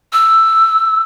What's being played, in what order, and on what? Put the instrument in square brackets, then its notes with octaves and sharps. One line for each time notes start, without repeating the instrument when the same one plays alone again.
[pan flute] E6